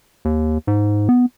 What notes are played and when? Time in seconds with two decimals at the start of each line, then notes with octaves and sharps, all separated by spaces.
0.25 D#2
0.67 G#2
1.09 B3